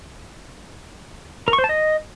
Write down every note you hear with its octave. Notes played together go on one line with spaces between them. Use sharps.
A#4
C#6
C5
A5
D#5